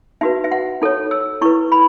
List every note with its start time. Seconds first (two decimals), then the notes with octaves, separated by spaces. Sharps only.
0.21 D#4 F#4 B4 E5
0.44 E5
0.51 F#5
0.82 D#4 A4 C#5
1.11 E6
1.41 E4 B4 C#6
1.72 B5